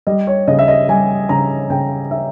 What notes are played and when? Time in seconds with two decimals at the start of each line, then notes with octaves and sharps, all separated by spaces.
0.07 G3 D#5
0.27 C#5
0.48 C#3 D#5
0.59 E5
0.68 D#5
0.88 G3 G#5
1.29 C#3 A#5
1.70 C#3 G5
2.11 C#4 E5